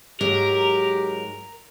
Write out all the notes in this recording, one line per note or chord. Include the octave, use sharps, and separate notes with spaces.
G#2 F#3 G#3 G4 A#4